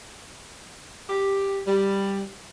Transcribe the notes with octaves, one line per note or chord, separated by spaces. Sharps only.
G4
G3